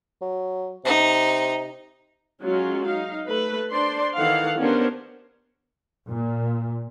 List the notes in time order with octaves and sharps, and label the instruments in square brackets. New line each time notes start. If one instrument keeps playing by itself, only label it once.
[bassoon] F#3
[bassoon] C3 [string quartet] D#4
[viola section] F#3 G#3 C#4 F4
D#4 F5
A3 B4
D4 C5 D5 C6
D#3 E3 A4 F5 F#5
B3 C#4 D4 G4 A#4 C5
[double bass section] A#2